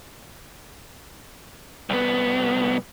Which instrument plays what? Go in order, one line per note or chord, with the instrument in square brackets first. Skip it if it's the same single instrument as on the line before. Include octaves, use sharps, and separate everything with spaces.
[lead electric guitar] C2 B3